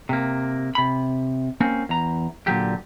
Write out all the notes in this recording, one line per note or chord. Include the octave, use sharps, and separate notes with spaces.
C3 A#3
C3 B5
A#3 C4 C#4
E2 A#5
A#2 D3 F#3 G4